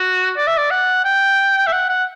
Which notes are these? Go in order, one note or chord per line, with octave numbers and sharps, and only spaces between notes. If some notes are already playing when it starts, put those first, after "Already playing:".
Already playing: F#4
D5
E5
D5
F#5
G5
E5
F#5
F#5